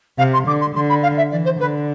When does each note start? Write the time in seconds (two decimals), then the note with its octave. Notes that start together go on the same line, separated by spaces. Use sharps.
0.18 C3 F5
0.33 C6
0.47 D3 D6
0.61 C6
0.75 D3 C6
0.89 B5
1.02 F5
1.17 E5
1.31 E3 D5
1.45 C5
1.59 D3 B4